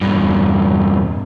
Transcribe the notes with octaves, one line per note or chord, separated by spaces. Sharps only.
E2 G2